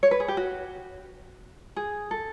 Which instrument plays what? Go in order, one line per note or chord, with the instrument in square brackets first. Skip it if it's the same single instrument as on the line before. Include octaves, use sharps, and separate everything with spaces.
[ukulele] C#5
B4
G#4
G4
F#4
G#4
A4